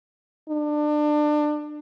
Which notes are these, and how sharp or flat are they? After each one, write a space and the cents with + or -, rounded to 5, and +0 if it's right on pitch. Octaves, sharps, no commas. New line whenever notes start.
D4 +25